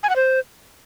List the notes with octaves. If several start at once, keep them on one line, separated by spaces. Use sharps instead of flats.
G#5
F#5
C5